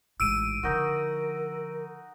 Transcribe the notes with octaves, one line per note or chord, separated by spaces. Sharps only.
A1 G#2 E6 D7 D#7
D3 F3 D#4 F#4 A#4